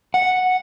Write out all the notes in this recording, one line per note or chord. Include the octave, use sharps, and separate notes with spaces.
F#5